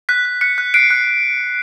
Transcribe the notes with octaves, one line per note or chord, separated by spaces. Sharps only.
F#6 B6
F#6
F#6 B6 C#7
F#6
F#6 C7 D7
F#6